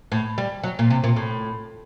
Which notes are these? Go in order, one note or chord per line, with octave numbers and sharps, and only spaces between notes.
A2
G3
F#3
A#2
C3
A#2
A2